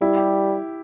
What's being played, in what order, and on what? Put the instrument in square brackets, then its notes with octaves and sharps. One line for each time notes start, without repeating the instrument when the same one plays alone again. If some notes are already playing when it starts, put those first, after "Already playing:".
[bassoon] G3 [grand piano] E4
[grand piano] G4